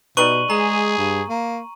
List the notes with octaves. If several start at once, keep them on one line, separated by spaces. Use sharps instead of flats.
B2 G3 D#4 B4 C#6 D#7 F#7
G#3 G#4 A#5
G2
A#3